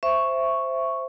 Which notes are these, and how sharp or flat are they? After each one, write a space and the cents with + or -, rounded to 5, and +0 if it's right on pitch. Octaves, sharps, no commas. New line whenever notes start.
C5 +0 E5 +10 C#6 +0